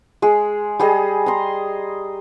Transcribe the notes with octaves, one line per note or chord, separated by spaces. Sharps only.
G#3 G#4
G3 G#4 D#5
A#5 C6